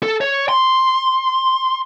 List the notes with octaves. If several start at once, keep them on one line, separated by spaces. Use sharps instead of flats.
A4
C#5
C6